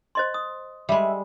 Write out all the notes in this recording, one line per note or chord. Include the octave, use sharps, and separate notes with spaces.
C5 D#5 C6
D#6
G3 G#3 E5